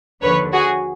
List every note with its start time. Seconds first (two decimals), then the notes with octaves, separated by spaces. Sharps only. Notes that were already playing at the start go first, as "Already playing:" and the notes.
0.22 D#2 D3 F3 B4 C#5
0.53 F#4 G#4